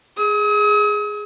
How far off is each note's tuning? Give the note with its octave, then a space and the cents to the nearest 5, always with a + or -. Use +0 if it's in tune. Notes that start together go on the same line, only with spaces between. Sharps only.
G#4 +0 D#6 +40